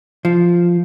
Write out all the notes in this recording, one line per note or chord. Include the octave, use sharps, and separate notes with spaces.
F3